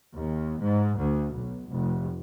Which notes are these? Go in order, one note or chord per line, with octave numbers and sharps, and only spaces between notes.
D#2
G#2
D2
B1
F1